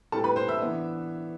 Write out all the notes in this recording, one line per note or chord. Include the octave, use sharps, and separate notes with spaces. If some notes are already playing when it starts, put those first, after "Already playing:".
A2 G3 C4 A4 A5
B4 B5
C5 C6
E5 E6
E3 B3 D4